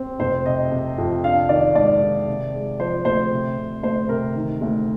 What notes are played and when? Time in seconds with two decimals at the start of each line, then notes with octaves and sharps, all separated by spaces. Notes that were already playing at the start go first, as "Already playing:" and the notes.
Already playing: C4
0.20 F1 C5
0.46 C3 D#5
0.72 C3
0.98 F2
1.23 D4 F5
1.49 D#3 D5
1.75 G#2 D5
2.02 D#3
2.27 C3
2.54 G#3
2.79 F3 C5
3.05 D2 C5
3.31 C3
3.57 C3
3.83 D2 C5
4.09 C3 A#4
4.35 D#3
4.61 D2